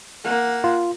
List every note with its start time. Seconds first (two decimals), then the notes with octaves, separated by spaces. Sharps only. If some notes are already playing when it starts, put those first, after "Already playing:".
0.24 A#3 F#5
0.64 F4